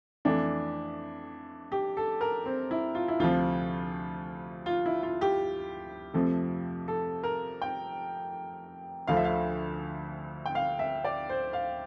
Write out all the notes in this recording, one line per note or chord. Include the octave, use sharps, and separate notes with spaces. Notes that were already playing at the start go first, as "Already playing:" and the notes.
F2 E3 A3 D4
G4
A4
A#4
C4
E4
F4
E4
D2 C3 F3 F4
F4
E4
F4
G4
F2 C3 F3 A3
A4
A#4
G5
D2 D3 F3 F5
E5
F5
G5
F5
E5
D5
C5
F5